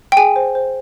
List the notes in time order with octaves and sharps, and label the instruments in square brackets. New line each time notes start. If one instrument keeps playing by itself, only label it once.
[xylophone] G5
G#4 G#5
C5
C5